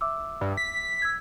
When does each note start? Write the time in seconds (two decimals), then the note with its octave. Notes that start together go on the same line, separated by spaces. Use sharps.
0.01 E5 D6 E6
0.41 G2
0.57 B6
1.02 E6 G#6